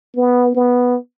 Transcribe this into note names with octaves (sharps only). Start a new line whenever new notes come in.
B3
B3